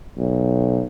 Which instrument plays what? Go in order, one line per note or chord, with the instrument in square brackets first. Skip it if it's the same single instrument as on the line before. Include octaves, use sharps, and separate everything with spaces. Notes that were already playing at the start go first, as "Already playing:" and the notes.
[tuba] B1